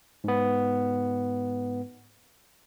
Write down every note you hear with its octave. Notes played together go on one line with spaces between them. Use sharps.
G#2 B3